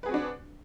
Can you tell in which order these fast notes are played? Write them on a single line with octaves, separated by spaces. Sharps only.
B4 G#4 C4 F#4 D4